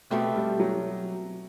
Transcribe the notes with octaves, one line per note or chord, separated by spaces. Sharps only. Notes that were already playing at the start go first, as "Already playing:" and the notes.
B2 A3 B3 C4 G4
G3
F#3